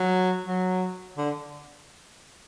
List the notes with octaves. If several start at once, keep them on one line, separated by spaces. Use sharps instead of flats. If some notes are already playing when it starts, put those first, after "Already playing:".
Already playing: F#3
F#3
D3